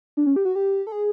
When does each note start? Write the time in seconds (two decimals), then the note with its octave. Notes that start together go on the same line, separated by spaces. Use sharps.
0.17 D4
0.27 C#4
0.36 G4
0.45 F#4
0.56 G4
0.87 A4
0.92 G#4